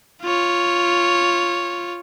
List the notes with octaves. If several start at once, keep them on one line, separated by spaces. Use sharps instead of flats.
F4 C#5